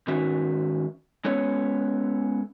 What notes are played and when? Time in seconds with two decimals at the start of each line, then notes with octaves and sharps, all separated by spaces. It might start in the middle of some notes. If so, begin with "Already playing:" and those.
0.07 G#2 D#3 C#4 F#4 E5
1.25 G#3 B3 C#4 A4 C#5